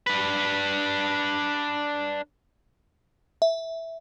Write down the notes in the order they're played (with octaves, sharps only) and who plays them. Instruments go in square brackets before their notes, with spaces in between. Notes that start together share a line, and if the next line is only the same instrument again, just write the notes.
[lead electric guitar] D4 B4
[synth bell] E5